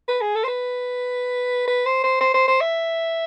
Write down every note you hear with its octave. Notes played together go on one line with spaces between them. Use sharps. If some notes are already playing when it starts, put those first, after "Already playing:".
B4
G#4
A4
C5
B4
B4
C5
C5
C5
C5
C5
E5